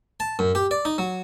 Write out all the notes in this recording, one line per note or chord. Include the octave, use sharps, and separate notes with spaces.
A5
F#2
G4
D5
D#4
F#3